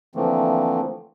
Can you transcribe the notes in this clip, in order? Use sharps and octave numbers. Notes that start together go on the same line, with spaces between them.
D3 E3 F3 A3 A#3 C4